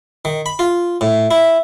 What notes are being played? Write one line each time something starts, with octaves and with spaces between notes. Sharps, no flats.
D#3
B5
F4
A2
E4